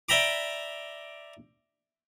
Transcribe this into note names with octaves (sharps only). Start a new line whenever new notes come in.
D5 E5 G5 A#5 B5 D6